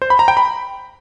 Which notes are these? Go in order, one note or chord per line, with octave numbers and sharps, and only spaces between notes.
C5
B5
A#5
G5
B5